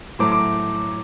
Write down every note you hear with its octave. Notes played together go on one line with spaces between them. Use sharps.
A2 F#3 A3 D6
D6